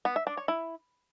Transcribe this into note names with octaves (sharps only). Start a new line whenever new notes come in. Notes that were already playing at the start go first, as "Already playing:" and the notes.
B3
E5
D4
C#5
E4